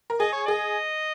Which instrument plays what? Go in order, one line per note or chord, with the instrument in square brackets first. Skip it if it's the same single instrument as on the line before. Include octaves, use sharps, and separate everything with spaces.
[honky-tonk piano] A#4
[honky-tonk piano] G#4 [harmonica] D#5
[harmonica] C#5
[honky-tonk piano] G#4 [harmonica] D#5